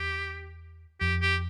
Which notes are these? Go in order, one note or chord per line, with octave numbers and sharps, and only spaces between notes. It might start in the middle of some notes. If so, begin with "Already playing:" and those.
Already playing: E2 G4
F2 G4
G4